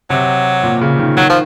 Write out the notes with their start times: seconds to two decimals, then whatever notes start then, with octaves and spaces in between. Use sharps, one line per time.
0.10 C3 F#3
0.63 A#2
0.81 C#3
0.99 D#3
1.17 D#3 F#3
1.30 F3